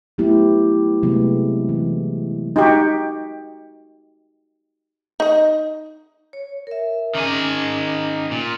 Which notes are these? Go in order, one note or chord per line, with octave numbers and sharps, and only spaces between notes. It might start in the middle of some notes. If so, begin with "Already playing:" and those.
F#3 A3 B3 E4 G4
C3 F#3 G#3 A3 B3
E3
D#4 F#4 G4
D#4 D#5
C#5
A#4 E5
D#3 C#4 G#4 A#5 D6
A#2